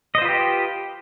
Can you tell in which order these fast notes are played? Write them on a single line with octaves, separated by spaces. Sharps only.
D#5 C5 F4 B4 G4